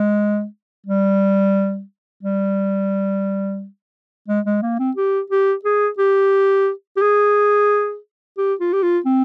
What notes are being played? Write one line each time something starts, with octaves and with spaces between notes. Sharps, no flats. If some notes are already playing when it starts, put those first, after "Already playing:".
Already playing: G#3
G3
G3
G#3
G#3
A#3
C4
G4
G4
G#4
G4
G4
G#4
G4
F4
G4
F4
C4